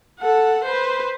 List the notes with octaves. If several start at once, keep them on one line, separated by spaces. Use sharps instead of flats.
A4 F#5
B4 C5